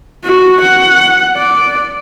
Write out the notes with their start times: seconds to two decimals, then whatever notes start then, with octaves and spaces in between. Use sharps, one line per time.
0.24 F#4
0.62 F#5
1.37 D5